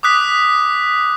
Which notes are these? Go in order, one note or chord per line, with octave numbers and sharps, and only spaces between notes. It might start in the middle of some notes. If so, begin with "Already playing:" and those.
D6 D#6 F#6 B6